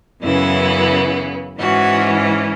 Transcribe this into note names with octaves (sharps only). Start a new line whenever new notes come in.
F#2 C#3 E3 B3 E4
G#2 E3 G#3 C#4 F#4